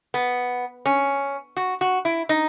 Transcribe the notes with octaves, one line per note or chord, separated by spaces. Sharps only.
B3
C#4
F#4
F#4
E4
D#4